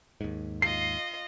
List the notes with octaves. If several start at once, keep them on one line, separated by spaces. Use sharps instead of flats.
D#2 G#2
F4 D#5 C7